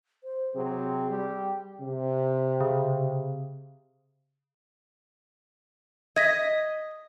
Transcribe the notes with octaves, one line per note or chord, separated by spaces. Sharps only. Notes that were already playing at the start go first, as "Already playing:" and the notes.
C5
C3 F#3 C4 G#4
G3 G4
C3
C#3
D#5 G#6 A#6 B6